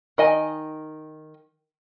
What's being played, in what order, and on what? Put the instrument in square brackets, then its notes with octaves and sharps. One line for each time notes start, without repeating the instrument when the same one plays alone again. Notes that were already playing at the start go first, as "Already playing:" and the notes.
[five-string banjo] D#3 D#5 G#5